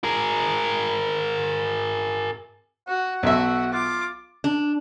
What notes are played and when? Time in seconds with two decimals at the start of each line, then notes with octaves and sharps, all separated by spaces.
0.04 G#4 A#4
2.88 F#4 F#5
3.23 B1 F#4 E5
3.73 F4 D6
4.44 D4